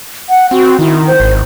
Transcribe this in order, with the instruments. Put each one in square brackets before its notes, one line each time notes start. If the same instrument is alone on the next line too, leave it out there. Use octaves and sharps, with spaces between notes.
[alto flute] F#5
[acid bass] C4 [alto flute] F#4
[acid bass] D#3 [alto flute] E4
[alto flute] C5
[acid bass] G#1